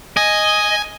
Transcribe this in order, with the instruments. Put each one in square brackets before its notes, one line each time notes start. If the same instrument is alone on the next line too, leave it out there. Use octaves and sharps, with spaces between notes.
[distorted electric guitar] D#5 [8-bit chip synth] G#5